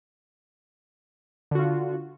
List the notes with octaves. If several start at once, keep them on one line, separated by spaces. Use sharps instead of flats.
D3 F4 F#4